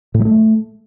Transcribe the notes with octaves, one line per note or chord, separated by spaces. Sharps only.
A2
F#3
A3